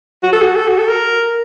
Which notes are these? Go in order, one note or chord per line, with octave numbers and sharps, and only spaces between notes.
F#4
A4
F#4
A4
F#4
A4
A#4